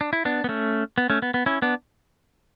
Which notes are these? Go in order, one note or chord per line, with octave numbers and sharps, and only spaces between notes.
D4
E4
B3 D4
B3
A3 C#4
B3
A3 C#4
B3
B3
C#4 E4
B3 D4